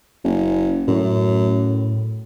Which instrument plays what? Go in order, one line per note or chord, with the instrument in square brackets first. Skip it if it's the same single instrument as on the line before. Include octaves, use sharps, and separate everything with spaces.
[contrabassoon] F#1
[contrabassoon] F#2 [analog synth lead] A2